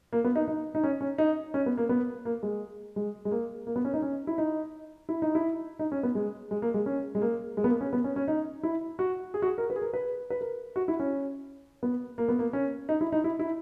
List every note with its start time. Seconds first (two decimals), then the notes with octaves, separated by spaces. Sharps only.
0.13 A#3
0.24 B3
0.36 D#4
0.48 D#4
0.75 D#4
0.84 C#4
1.01 C#4
1.18 D#4
1.54 C#4
1.66 B3
1.77 A#3
1.89 B3
2.25 A#3
2.43 G#3
2.96 G#3
3.25 G#3
3.31 A#3
3.67 A#3
3.76 B3
3.85 C#4
3.94 D#4
4.02 C#4
4.27 E4
4.38 D#4
5.09 E4
5.22 D#4
5.35 E4
5.79 D#4
5.92 C#4
6.03 B3
6.15 G#3
6.51 G#3
6.62 A#3
6.74 G#3
6.86 C#4
7.15 G#3
7.22 A#3
7.57 G#3
7.64 B3
7.69 A#3
7.81 C#4
7.93 B3
8.04 C#4
8.16 C#4
8.28 D#4
8.63 E4
8.99 F#4
9.34 G#4
9.42 F#4
9.46 G#4
9.58 A#4
9.70 B4
9.76 G#4
9.82 A#4
9.94 B4
10.30 B4
10.41 A#4
10.76 F#4
10.88 E4
11.00 C#4
11.83 B3
12.18 A#3
12.29 B3
12.39 A#3
12.53 C#4
12.89 D#4
13.01 E4
13.12 D#4
13.24 E4
13.39 E4